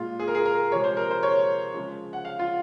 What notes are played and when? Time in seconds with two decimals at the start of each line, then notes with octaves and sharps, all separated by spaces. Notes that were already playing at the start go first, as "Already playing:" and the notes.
Already playing: A#2 G#3 F4
0.20 G#4
0.28 A#4
0.35 G#4
0.46 A#4
0.71 C3 F3 G#3 C#5
0.84 C5
0.97 A#4
1.10 C5
1.23 C#5
1.74 C#3 F3 G#3
2.13 F#5
2.25 F5
2.39 F4